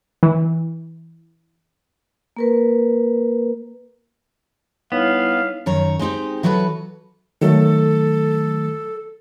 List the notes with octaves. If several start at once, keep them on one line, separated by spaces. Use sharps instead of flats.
E3
A#3 A#4 B4
G3 B3 D#4 E4 C#5 F5 B6
F#2 D#3 C#5 A#5
G#3 C4 D#4 G4
E3 F#3 F#4 A4 B4
D#3 F#3 A3 A4